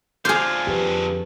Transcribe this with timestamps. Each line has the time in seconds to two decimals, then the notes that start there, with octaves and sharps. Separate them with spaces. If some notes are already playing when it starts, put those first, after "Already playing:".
0.25 D3 F4 G#4 C5 D6 F6 G#6
0.67 F2 G4 B4